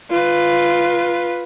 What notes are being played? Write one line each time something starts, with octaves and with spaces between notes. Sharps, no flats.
F4 B4